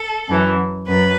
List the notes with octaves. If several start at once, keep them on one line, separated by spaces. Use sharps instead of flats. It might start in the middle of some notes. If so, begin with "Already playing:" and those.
Already playing: A4
F#2 E3
F#2 B4